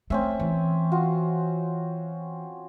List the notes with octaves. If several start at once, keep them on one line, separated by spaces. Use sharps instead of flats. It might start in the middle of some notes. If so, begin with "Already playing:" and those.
A3 C4 C#4 E5
E3
F4 F#4